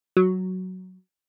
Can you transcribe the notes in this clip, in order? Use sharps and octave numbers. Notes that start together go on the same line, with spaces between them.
F#3